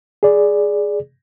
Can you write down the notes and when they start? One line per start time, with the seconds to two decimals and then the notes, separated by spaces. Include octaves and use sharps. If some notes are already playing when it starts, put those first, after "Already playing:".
0.23 G#4 D5